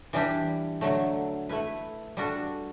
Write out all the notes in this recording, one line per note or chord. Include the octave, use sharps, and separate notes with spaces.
E3 G3 D4 G4
D3 F#3 A3
A3 E4 B4
G3 D4 F#4 A4